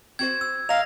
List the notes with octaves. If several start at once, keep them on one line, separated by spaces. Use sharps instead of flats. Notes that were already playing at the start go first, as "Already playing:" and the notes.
C4 F#4 C5 G#6
E6
D#5 F5 A#5 A#6 F7